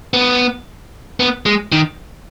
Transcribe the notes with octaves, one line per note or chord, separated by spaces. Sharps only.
B3
B3
G#3
D#3